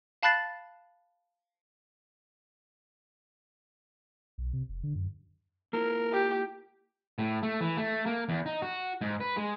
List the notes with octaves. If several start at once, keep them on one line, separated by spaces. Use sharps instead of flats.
F5 A5 B5 F#6 A6 C7
B1
C3
F1
D3
F#2
A#3 E4 F4 A#4
G4
A2
A3
E3
A3
A#3
E2
D#4
F#4
G#2
B4
G#3